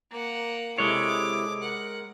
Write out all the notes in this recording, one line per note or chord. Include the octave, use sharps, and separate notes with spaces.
A#3 F#5
C3 G#3 E4 A4 C#5 D6
A#4 F#5